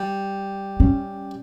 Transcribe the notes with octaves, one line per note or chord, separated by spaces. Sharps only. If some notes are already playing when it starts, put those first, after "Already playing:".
Already playing: G3
C#4